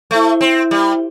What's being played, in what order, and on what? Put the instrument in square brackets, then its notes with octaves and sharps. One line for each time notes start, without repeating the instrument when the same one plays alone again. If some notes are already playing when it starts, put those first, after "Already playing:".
[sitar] A3 [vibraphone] E4 C5 E5
[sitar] C4
G3